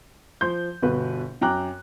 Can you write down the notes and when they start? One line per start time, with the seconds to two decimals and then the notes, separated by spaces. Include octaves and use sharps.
0.41 F3 C6 G6
0.83 G1 B2 B4
1.41 F#2 G5 A#5 D6 F#6